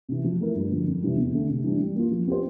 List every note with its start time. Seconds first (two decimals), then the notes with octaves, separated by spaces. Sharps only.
0.09 C3 E3
0.24 F3
0.40 A3 E4 A#4
0.55 G2
0.71 D3 F3
0.87 F2
1.02 C3 E3 G3
1.17 E2
1.33 D3 A3 D4
1.50 C3
1.64 E3 G3 D4
1.81 G3
1.95 A#3 F4
2.12 F3
2.27 C4 G4 C5